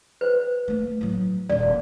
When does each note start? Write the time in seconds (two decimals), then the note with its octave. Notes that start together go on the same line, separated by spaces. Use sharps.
0.21 B4 C5
0.68 A3 A#3
1.01 A2 F#3
1.49 D#1 A#1 D5